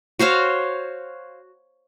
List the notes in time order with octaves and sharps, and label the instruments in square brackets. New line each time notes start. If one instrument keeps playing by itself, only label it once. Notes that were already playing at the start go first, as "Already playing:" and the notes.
[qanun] F#4 C5 C#5 F5